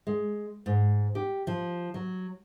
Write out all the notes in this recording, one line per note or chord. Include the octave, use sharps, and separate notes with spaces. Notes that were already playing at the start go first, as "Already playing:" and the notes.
G#3
G#2
G4
F3
F#3